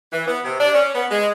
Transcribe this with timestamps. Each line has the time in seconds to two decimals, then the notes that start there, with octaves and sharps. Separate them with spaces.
0.12 E3
0.26 B3
0.44 C3
0.59 D4
0.74 C#4
0.95 B3
1.11 G#3